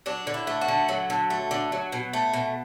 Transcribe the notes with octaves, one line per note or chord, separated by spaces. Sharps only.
F#3 D4
D3
E4
A3
F#4
D3
F#3
D3
A3
D3
F#3
B2
A3
B2